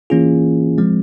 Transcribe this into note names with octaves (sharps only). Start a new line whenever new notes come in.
E3 A#3 C#4 F4 G#4
F3 G#3 C4